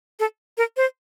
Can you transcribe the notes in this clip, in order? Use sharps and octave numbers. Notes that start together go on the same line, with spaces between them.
A4
A#4
C5